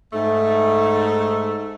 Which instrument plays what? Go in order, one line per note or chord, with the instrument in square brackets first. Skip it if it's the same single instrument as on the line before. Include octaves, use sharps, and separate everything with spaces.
[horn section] G#2 A3